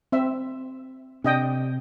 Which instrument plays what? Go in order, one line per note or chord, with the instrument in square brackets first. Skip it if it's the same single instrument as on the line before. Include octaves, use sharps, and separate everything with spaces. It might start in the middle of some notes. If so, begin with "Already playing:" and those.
[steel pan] C4 E5
[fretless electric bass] C3 [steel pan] D4 D#5 G5